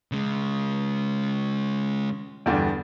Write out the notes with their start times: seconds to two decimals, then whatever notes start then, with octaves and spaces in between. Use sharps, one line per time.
0.12 C#3 G#3
2.46 E2 G2 D3